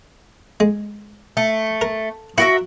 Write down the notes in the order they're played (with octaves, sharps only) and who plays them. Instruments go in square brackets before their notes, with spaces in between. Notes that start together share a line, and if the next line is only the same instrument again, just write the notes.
[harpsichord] G#3
[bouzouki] A3
[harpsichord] A#4
[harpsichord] E4 [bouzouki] F#4 A#4 E5